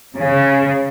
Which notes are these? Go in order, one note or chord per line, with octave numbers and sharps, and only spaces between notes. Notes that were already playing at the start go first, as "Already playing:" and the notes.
C#3